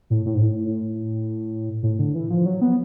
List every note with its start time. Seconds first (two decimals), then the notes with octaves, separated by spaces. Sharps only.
0.10 A2
0.26 A2
0.34 G#2
0.42 A2
1.83 A2
1.99 D3
2.15 E3
2.30 F3
2.46 F#3
2.61 B3